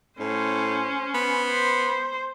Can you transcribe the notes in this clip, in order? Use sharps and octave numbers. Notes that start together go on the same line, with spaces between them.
A2 C#4 C5
B3
C5